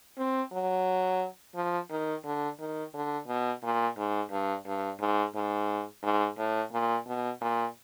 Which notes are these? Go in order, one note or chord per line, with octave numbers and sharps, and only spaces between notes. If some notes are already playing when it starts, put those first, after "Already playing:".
C4
F#3
F3
D#3
D3
D#3
D3
B2
A#2
G#2
G2
G2
G#2
G#2
G#2
A2
A#2
B2
A#2